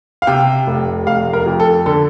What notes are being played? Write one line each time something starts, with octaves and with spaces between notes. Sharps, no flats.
F5
C3 G5
F1
F1 F5
A#4
F2
A4
D3 A4